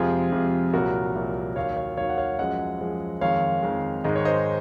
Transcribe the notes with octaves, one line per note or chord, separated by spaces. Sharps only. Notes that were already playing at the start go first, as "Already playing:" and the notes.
Already playing: F2 C3 F3 G#3 F4 G#4
F2 C3 F3 G#3
C2 A#2 F#3 F#4 A#4
C2 A#2 F#3
D#2 D#3 F#3 C#5 F5
C#5 F5
D#2 D#3 F#3 C#5 F5
F#5
C#5 F5
F#2 F3 G#3 D#5 F#5
F#2 F3 G#3
F2 D#3 G#3 C#5 F5
F2 D#3 G#3
G#2 D#3 G#3 D#5
C#5
C5 D#5